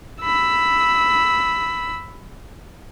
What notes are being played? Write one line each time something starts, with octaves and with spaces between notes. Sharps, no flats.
B5 E6